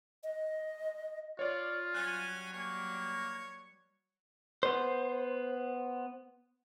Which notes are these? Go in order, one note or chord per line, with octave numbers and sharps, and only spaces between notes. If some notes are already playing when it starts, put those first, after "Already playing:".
D#5
F4 C#5 D5
F#3 G3 C#4 G#5 F#6 A6
A#3 C#5
B3 C5